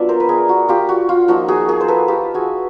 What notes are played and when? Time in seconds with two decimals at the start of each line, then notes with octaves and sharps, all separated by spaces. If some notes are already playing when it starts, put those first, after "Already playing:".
Already playing: F#3 B3 D4 F4 D5 E5
0.09 A#4 C5
0.20 B4
0.29 G#4 A#4
0.49 F#4
0.69 F4 G4
0.89 F#4
1.09 F4
1.28 F3 A#3 D#4 F#4
1.48 F#4 G#4
1.68 G#4 A#4
1.81 C5
1.88 A4 B4
2.08 F4 G4
2.34 F#4 G#4